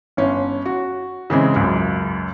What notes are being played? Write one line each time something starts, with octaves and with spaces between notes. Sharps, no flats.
G1 C#4
F#4
C#3 E3 G#3 C4
C#2 F#2